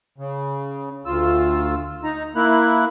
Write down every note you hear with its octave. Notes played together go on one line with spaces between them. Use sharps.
C#3
D2 F4 E6
D#4 A#5
A#3 E4 F#6